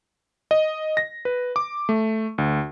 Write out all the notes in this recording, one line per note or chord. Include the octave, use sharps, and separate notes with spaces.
D#5
A#6
B4
D6
A3
D2